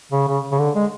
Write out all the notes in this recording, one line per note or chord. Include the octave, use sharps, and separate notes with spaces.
C#3
C#3
C#3
D3
G#3